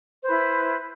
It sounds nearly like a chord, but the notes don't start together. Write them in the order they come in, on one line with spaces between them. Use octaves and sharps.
C5 B4 E4